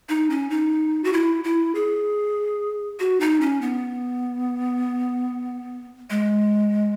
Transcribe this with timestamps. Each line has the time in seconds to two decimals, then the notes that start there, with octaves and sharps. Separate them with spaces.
0.09 D#4
0.30 C#4
0.50 D#4
1.04 F#4
1.13 E4
1.44 E4
1.75 G#4
3.00 F#4
3.21 D#4
3.41 C#4
3.62 B3
6.10 G#3